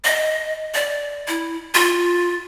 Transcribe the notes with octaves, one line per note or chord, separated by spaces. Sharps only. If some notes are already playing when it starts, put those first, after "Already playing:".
D#5
D5
E4
F4